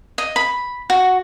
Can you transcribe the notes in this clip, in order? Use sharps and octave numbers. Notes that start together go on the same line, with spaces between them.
D#5
B5
F#4